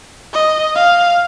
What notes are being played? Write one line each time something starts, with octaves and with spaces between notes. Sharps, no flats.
D#5
F5